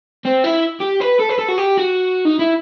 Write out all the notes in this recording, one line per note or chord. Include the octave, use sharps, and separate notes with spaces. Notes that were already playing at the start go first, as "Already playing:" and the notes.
C4
E4
G4
B4
A4
B4
A4
F#4
G4
F#4
D#4
E4